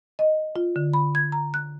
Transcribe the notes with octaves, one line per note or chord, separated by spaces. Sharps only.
D#5
F4
D3
B5
G#6
A#5
F#6